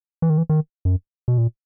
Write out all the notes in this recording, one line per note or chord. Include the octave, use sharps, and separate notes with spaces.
E3
D#3
E3
D#3
F#2
B2
A#2